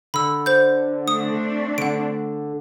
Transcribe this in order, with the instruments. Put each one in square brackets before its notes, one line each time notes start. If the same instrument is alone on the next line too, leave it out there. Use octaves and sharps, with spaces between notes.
[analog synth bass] D3 [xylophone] B5 E6
[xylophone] C5 G6
[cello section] A3 C4 D4 [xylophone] D#6
[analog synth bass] D3 [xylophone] F#5 D7